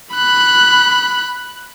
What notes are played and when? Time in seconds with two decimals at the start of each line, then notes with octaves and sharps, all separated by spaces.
0.14 B5 F#6